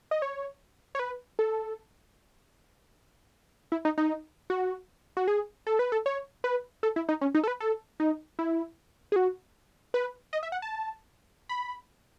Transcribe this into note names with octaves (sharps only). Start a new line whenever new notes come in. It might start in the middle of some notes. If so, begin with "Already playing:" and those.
D#5
C#5
C#5
B4
A4
E4
D#4
D#4
F#4
F#4
G#4
A4
B4
A4
C#5
B4
A4
E4
D#4
C#4
D#4
A4
B4
A4
D#4
E4
G#4
F#4
B4
D#5
E5
F#5
A5
B5